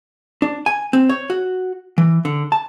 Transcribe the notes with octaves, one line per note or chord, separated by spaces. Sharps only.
D4
G#5
C4
C#5
F#4
E3
D3
A5